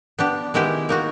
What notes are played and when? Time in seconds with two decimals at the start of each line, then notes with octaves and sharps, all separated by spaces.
0.19 B3 D4 G4
0.54 D#3 G#3 B3 E4 G4
0.89 A#3 D#4 F#4